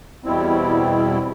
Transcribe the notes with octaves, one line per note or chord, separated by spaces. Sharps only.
E2 B2 G3 C4 E4